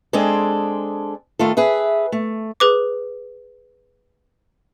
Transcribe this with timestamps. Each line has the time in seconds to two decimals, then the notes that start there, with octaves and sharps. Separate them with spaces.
0.13 G#3 C4 D4 G#4 A4
1.39 D#3 A3 F4 A4
1.57 G#4 B4 E5
2.12 A3
2.60 G#4 B4 D6